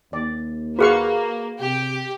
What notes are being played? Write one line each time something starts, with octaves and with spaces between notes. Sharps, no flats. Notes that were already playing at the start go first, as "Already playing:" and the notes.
D#2 D5
A#3 F#4 G#4 B4 F5 F#5 C#6
C3 G4